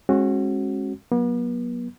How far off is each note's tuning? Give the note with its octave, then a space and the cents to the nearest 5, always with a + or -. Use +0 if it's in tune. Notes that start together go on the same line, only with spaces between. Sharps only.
G#3 +0 C#4 -40 F#4 +0
F#3 +0 B3 -40